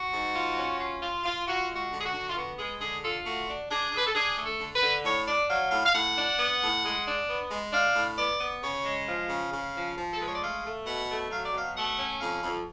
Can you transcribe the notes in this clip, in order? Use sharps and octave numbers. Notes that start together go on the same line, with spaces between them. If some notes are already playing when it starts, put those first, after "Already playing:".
Already playing: F#4
G#2
F4
C#4
F4
F4
F4
F4 F#4
G#3
F#4
D3
G#4
F#4
D3
F4
B3 F#4
G#3 G#4
D3 G#4
F4 A4
A3 F#4
D4
D4 G#4
D4 B4
A4
D4 G#4
A3
A4
D3
B4
D3
A2 C#5
D4 D5
F#3 F5
A2 F5
F5
A2 F#5
D4
B3
A2
G#3
D4
B3
G#3
D4 F5
A2
B3 D5
B3
C#3 C#5
G#3
F3 F5
C#3
C#3
F3
F3
A4
G#3 B4
C#5
D5
A3 F5
A3
B2 F#5
A3
F#3 F5
D5
B2 F5
A3 F#5
C#4
F2 F5
F2